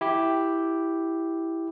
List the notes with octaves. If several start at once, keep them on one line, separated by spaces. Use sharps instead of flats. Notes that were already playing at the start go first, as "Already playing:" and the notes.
E4 G4